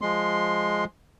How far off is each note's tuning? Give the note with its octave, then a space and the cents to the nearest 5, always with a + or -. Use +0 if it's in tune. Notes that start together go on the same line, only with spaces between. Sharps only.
F3 +0 G#3 +0 C6 +5